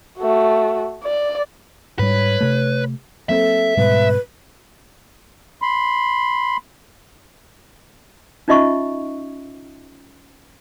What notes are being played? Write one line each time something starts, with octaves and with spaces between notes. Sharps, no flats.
A3 F#4
D5
G#2 G3 B4 C#5
C3 A3
F#3 A#3 C4 A4 E5
G#2 B2 G3 B4
B5 C6
C#4 D#4 F4 D#5 E5 C#6